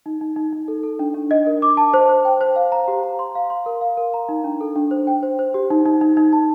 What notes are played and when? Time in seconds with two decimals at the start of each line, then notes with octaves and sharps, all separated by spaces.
0.06 D#4
0.21 D#4
0.36 D#4
0.53 D#4
0.68 A4
0.83 A4
0.99 D4
1.15 D4
1.31 D#5
1.47 A#4
1.62 D6
1.77 A5
1.94 C5
2.09 C5
2.25 G5
2.41 C5
2.56 F5
2.72 A#5
2.88 G4
3.03 A#5
3.19 C6
3.35 F5
3.50 C6
3.66 A#4
3.81 F5
3.97 A#4
4.14 A#5
4.29 D#4
4.44 D4
4.61 A4
4.76 D4
4.91 C5
5.07 G5
5.23 C5
5.39 C5
5.54 G4
5.70 D#4
5.86 D#4
6.01 D#4
6.17 D#4
6.33 A5